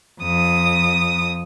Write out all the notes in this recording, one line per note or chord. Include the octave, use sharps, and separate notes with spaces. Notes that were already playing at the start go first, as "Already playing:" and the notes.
F2 D#6